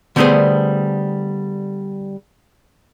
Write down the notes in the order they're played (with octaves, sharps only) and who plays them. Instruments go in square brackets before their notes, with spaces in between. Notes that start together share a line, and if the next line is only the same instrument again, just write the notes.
[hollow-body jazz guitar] D3 G3 A3 B3 G#4 C5